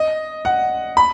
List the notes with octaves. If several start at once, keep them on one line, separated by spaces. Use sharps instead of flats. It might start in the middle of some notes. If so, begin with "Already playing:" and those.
Already playing: D#5
F#5
B5